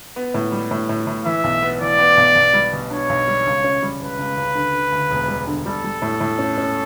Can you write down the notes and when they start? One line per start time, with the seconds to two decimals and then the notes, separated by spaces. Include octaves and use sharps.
0.16 B3
0.34 A2
0.52 G3
0.71 A2
0.89 A2
1.07 A2
1.25 E3 E5
1.44 B1
1.63 B3
1.81 E3 D5
1.99 B3
2.17 B1
2.35 B1
2.53 G3
2.73 B2
2.90 D4 C#5
3.10 B1
3.28 G3
3.46 C#2
3.64 C#4
3.82 G3
4.00 C#2 B4
4.19 C#2
4.37 C#2
4.55 D3
4.73 D3
4.92 D2
5.11 E1
5.28 G3
5.47 D3
5.65 G3 A4
5.84 G3
6.02 A2
6.20 A2
6.39 C#4
6.58 C#4